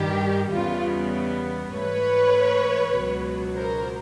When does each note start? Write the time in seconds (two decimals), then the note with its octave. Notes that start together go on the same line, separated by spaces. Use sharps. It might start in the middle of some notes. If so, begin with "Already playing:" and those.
Already playing: G2 D#3 G3 G4
0.52 E2 C#3 E3 G3 B3 F4
1.73 G#2 E3 A3 B4 C#5
2.95 C#2 B2 F#3
3.55 A#4 C5